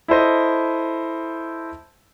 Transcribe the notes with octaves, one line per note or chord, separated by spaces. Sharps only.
E4 A4 C5 D#5